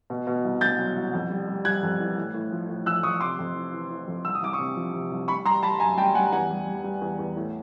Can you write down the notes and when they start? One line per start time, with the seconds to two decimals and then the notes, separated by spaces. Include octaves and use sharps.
0.10 B2
0.27 B2
0.44 C2
0.61 C2 G6 A6
0.79 F#3
0.96 C2
1.13 F2
1.30 G3
1.48 G3
1.65 G3 F#6 G#6
1.83 F2
2.00 E3
2.17 A2
2.34 A2
2.52 F3
2.69 A2
2.86 F3 E6 F#6
3.03 F3 C#6 D#6
3.21 C3 C6 D6
3.39 F2
3.56 E3
3.73 E3
3.90 E3
4.07 F2
4.25 C2 E6
4.35 D#6
4.42 C2 D6
4.53 C#6 D#6
4.59 C3
4.77 F3
4.94 C3
5.12 C2
5.28 G3 B5 C#6
5.46 G3 A#5 C6
5.63 G3 A5 B5
5.80 F#2 G#5 A#5
5.97 G3 G5 A5
6.15 G3 F#5 G#5
6.32 E2 F#5 G#5
6.50 G3
6.67 G3
6.84 G3
7.01 E2
7.19 E2
7.36 A2